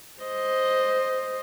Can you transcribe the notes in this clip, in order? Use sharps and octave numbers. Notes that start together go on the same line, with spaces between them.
C5 D#5